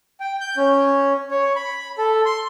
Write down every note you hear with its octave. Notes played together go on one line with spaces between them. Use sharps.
G5
G6
C#4
C#5
B5
A4
C6